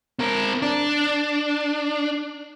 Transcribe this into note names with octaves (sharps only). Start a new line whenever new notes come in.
C4 A#4
D4